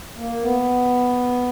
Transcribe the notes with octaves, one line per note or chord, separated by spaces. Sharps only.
A#3
B3